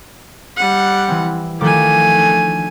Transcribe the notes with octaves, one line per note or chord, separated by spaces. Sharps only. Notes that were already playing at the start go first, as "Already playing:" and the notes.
G3 F#5
E3 C4
D#3 F3 A3 G#5 D6
D4